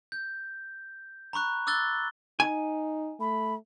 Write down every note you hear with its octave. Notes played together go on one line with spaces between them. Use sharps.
G6
A#5 B5 C#6 F#6
D6 E6 F#6 A6 G7
D#4 G#5
A3 B5